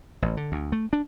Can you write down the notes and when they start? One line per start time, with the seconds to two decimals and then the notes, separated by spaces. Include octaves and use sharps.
0.22 A1
0.37 D3
0.52 D2
0.72 A3
0.93 D4